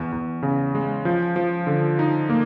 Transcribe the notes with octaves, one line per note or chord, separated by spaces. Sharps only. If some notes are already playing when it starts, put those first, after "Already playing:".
Already playing: E2
E2
C#3
G#3
F3
F3
D3
D#4
A#3